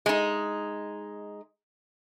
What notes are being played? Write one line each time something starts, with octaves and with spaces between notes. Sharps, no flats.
G#3 D#4